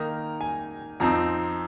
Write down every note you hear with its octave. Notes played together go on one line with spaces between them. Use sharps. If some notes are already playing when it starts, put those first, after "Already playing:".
Already playing: D#3 A#3 D#4 A#5
G#5
F2 F3 C4 D#4 A#5